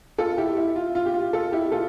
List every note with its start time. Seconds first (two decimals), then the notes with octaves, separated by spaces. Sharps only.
0.18 F4 A4
0.38 E4 G4
0.57 E4
0.76 F4
0.95 F4
1.06 G4
1.14 F4
1.33 F4 A4
1.52 E4 G4
1.72 F4 A4